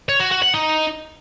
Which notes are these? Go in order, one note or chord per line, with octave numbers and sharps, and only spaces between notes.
C#5
F#4
F#4
F#5
D#4